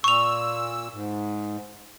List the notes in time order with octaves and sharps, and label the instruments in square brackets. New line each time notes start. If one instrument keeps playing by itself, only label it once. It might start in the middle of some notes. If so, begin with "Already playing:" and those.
[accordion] A#2 E6 [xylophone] C#6 F7
[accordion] G#2